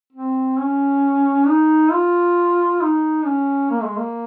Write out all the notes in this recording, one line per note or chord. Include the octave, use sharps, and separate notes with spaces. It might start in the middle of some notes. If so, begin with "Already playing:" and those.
C4
C#4
D#4
F4
D#4
C#4
A#3
G#3
A#3